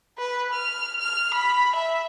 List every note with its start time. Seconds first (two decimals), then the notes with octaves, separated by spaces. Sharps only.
0.19 B4
0.53 F6
0.99 F6
1.34 B5
1.75 E5